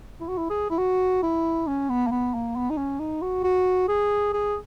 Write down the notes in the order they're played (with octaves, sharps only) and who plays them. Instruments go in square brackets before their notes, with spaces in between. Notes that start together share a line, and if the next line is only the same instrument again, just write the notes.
[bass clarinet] E4
F#4
E4
G#4
E4
F#4
E4
C#4
B3
A#3
B3
A#3
B3
D#4
C#4
D#4
F#4
F#4
G#4
G#4